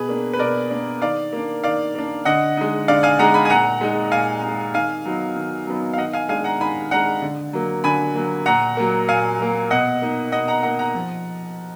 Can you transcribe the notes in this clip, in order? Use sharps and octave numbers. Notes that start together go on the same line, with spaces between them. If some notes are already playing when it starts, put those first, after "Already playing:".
Already playing: B2 G#4 B4
A#3 D4
B4
B2 A#4 D5
A#3 D4
D#3 D5 F5
A#3 D4
D#3 D5 F5
A#3 D4
D3 D#5 F#5
G#3 D#4
D3 D5 F5
F5 G#5
G#3 D#4 F#5 A#5
G#5 B5
G#5
A#2 F#5 A#5
G#3 D#4
A#2 F5 G#5
D#4
G#3
D#3 F5 G#5
F#3 B3 D#4
D#3
F#3 B3 D#4
F5
D#3 D#5 F#5
F5 G#5
G#3 D4 F5 G#5
F#5 A#5
D#3 G#5 B5
G#3 D4 F#5 A#5
D3
F#3 A#3
D3 G#5 B5
F#3 A#3
A#2 F#5 A#5
F#3 A#3
A#2 F5 G#5
F#3 A#3
B2 D#5 F#5
A#3 D#4
B2 D#5 F#5
F#5 A#5
A#3 D#4 F#5 A#5
F#5 A#5
F3